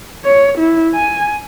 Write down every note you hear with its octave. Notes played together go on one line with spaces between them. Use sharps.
C#5
E4
G#5